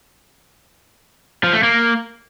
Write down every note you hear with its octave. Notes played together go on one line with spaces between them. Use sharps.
F3
A3
A#3